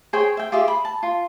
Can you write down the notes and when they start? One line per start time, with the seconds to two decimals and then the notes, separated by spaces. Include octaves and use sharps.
0.13 G#4 C5 C#5 G5
0.37 E5 G5
0.52 F4 G4 G#4 E5
0.68 B5
0.85 A5
1.03 F4